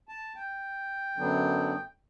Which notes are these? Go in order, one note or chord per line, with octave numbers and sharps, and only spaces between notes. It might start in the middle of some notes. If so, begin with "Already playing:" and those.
A5
G5
F#2 D3 F#3 B3 D4